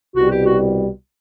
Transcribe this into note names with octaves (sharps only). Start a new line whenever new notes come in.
C2 B2 G3 F#4
G4
F#4